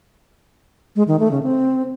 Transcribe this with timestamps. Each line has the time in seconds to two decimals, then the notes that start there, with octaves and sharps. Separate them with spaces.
0.96 G#3
1.08 D#3
1.19 A3
1.31 C#3
1.43 C4